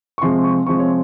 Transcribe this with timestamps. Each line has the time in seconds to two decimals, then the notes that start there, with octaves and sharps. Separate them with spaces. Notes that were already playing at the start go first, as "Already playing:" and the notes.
0.18 C#6
0.22 C3 F3 G#3 C4 C6
0.44 C#6
0.67 C3 F3 G#3 C4 C#6
0.79 C#5